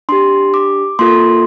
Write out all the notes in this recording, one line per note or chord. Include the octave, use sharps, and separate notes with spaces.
D4 G4 C6
D6
A#3 F4 A4 C6